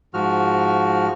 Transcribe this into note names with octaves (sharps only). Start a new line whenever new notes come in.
G#2 F3 F#4 F6